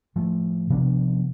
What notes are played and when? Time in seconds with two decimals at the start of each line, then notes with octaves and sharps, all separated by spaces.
0.16 A2 F3 A3
0.70 C3 F3 B3 D4